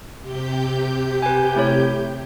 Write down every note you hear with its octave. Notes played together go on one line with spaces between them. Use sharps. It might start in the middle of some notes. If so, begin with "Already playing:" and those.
C3 G4 G6
B4 G#5
A3 E4 C#5